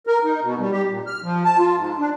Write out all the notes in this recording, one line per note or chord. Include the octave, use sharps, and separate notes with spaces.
A#4
D#4
B2
G3
G4
A#2
F6
F3
A5
F4
G#2
D4